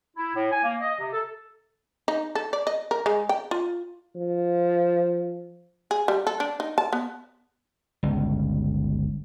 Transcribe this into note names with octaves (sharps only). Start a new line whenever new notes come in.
E4
A2
G#5
A#3
D#5
C3
A4
D#4
A4
D5
D#5
A#4
G#3
G5
F4
F3
G#4
G3
A4
D4
D#4
A5
B3
G1 C#2